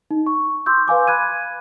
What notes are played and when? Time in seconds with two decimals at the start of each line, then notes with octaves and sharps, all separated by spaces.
0.11 D#4
0.27 C#6
0.66 C6 D6 E6 G6
0.88 B4 F5 G#5 D6
1.07 B5 F#6 G#6 D#7